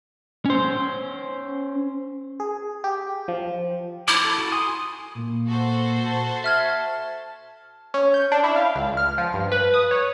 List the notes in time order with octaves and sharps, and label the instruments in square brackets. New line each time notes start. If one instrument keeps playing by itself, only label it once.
[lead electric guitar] C#4 C5
[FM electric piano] G#4
G4
F3
[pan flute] E4 [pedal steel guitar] D6
[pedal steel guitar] A4
F#4
G#5 C6 D#6
[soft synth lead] A#2
[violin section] F#4 A4 C5
[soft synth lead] A5
[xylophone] E5 F6 G#6
[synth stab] C#4
G6
D4
E4
F5
C#2
F6
F3
G2
B4
D#6
C#5